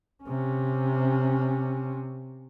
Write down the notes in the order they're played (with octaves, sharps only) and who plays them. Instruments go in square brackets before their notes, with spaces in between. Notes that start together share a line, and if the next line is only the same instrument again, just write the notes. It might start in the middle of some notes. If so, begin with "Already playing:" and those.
[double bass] C3 C#4